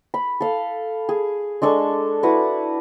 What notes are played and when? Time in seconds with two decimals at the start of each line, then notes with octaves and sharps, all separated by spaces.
0.14 B5
0.41 A4 F5
1.09 G#4
1.62 G#3 D4 A4 C#6
2.23 E4 F#4 B4 F#5